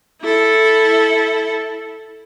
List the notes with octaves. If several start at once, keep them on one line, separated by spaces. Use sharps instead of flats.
E4 A4